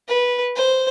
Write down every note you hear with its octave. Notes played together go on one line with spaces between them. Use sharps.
B4
C5